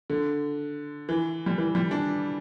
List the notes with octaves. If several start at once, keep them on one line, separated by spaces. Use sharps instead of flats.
D3
E3
G3
E3
G3
D4